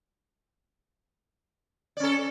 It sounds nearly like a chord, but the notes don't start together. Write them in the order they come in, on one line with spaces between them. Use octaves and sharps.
D5 C#4 A4